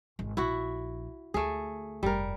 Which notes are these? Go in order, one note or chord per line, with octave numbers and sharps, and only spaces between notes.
G#1
A#1 E4 F#4
D2 A3 G#4
F1 G2 G3 A#4